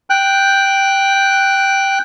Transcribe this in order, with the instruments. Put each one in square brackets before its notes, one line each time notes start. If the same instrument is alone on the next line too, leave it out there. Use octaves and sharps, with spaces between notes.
[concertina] G5 F#6